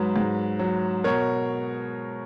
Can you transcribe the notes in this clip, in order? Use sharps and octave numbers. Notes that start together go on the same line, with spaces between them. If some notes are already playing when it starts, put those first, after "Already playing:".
Already playing: G#2 F#3 B4
G#2
F#3
B2 A#4 C#5